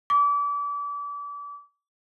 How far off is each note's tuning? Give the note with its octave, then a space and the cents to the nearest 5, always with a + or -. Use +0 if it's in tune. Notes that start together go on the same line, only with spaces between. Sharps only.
D6 -30